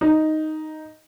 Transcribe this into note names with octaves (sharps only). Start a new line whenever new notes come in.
D#4